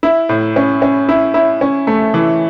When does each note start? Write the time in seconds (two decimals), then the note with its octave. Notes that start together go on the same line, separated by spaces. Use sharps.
0.03 E4
0.29 A2
0.56 C#4
0.82 C#4
1.09 E4
1.34 E4
1.61 C#4
1.87 A3
2.14 E3